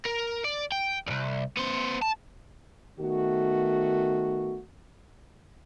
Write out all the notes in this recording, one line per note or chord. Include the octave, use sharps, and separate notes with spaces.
A#4
D5
G5
C2 G2
B3 C5
A5
D#3 A3 B3 F#4